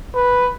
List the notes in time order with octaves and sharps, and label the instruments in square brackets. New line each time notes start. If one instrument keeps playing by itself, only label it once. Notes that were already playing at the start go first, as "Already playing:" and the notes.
[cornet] B4